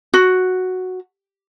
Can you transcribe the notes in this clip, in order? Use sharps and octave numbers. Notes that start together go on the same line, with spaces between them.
F#4